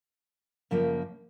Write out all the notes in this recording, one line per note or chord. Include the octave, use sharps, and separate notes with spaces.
F#2 C#3 F3 A#3